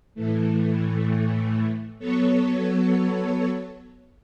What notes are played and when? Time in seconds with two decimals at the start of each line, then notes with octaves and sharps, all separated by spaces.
0.15 A2 E3 A3
1.99 F#3 B3 A4 C#5